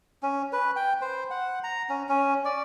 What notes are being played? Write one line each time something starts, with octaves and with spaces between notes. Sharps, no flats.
C#4
B4
G5
C5
F#5
A#5
C#4
C#4
D5